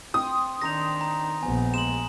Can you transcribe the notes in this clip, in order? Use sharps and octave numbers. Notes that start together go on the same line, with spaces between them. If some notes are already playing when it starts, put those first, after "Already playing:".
C4 D#6
D#3 D4 D#4 C5 E5 A#6 F7
A#5
A#1 B3 G#5
G#3 E7 F#7